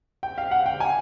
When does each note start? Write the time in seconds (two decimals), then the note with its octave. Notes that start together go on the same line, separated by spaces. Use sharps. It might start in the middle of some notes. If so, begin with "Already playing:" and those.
0.23 G5
0.38 F5
0.51 F#5
0.66 G5
0.80 G#5